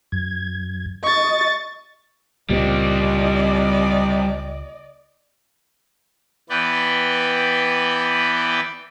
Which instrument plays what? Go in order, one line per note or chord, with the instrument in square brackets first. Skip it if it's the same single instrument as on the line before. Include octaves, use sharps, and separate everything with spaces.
[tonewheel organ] F#2 G#6
[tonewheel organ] D#5 [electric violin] C#6 A6
[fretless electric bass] C#2 A#2 [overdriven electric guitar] G3 C4 [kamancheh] D5 D#5
[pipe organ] E3 B3 B4 D5 G5